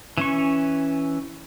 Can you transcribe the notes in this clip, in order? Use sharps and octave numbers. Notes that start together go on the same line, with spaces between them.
E3 C#4 C#6